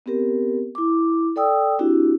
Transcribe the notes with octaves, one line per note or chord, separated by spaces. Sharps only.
B3 C4 G4 A#4
E4 D6
A4 D5 G5 D#6 E6
C4 D4 E4 F#4 G4